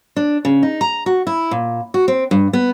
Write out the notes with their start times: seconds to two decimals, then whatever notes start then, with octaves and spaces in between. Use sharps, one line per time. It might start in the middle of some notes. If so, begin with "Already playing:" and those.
0.16 D4
0.45 C#3
0.63 D#4
0.81 A#5
1.06 F#4
1.27 E4
1.51 A#2
1.94 F#4
2.08 C4
2.31 G2
2.53 B3